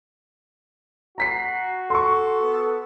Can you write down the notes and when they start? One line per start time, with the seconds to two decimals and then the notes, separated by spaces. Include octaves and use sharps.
1.18 F#4 A#5 B6 C7
1.90 A4 C6 C#6
2.42 B3